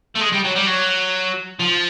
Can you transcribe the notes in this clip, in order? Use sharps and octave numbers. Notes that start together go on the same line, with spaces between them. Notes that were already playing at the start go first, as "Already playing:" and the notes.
A3
G#3
G3
F#3
G3
F#3
F3